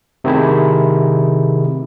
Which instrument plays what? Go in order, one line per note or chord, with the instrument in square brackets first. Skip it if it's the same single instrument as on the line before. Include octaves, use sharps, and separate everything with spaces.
[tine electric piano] C3 D#3 A3 E4 G#4